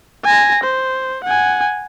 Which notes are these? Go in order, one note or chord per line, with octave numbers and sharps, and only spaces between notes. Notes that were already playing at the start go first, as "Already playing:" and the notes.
G#5 A#6
C5
F#5 G#5